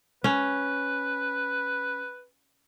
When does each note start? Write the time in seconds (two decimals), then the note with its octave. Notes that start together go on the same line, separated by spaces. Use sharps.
0.24 C#4 B4